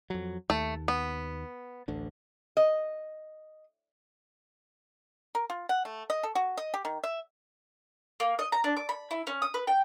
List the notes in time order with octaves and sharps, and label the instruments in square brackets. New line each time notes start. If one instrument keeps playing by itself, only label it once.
[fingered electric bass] F2 F#3
[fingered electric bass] D#2 [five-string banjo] A3
[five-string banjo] B3
[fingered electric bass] A1 D2 D3
[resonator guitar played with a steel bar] D#5
[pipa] A#4
F4
F#5
A3
D#5
A4
F#4
D#5
G4
D#3
E5
[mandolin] A#3
D#5
A#5
D4
D6
B5
E4
C#4
D#6
B4
G5